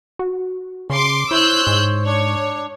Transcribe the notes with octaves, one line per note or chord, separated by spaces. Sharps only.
F#4
C#3 C6 D6
E4 C5 C#5 E6 F#6 G6
G#2
D4 C#5